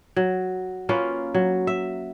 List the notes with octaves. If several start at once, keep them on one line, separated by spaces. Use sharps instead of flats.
F#3
A#3 C#4 F4 B4
F#3
E5